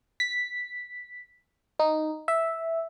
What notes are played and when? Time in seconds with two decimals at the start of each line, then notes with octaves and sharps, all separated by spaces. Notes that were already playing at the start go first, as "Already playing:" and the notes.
0.20 B6
1.79 D#4
2.28 E5